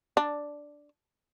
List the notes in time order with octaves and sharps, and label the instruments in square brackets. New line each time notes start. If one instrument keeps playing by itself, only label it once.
[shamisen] D4